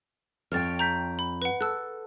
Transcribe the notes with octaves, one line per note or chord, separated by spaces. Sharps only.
F2 C#5 G5 F6 A6
A#5 G6 B6
B5
B4 F#5
A4 E6 F#6